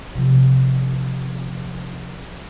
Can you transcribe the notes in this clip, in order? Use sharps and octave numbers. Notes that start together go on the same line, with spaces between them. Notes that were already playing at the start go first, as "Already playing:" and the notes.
C3 F3